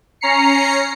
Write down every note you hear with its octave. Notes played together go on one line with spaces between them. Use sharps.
C#4 A#5 C7 C#7